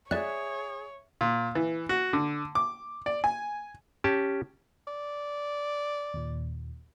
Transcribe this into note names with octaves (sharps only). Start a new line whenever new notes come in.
G#4 C#5 D5 E5 F#6
A#2
E3
F#4
D3
D6
D5
G#5
C#4 G4 A5
D5
D#2 A#2